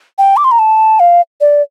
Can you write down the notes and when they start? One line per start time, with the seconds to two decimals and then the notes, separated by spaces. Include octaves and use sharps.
0.18 G5
0.37 D6
0.44 C6
0.51 A#5
0.59 A5
1.00 F5
1.41 D5